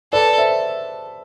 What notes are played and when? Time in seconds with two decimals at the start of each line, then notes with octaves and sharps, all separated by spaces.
0.13 A4 B4 D5
0.38 C5 E5